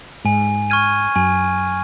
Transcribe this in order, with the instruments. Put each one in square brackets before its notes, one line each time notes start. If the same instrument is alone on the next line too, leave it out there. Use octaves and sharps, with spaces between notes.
[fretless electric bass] G#2 [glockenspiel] G#5
[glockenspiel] C#6 F6 G#6 D#7
[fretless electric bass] F#2 [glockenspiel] G#5